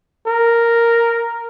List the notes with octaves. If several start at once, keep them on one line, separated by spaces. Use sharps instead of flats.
A#4